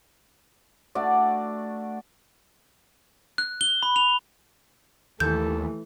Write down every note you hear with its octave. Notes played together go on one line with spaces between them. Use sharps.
A3 D4 F#4 D5
F#6
G7
B5
F7
D#2 E3 A3 A4 G6